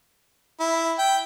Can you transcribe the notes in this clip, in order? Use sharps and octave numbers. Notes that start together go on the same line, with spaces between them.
E4
G5